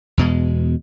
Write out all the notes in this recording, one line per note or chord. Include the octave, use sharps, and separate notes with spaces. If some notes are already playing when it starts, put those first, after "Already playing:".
E2 B2 G#3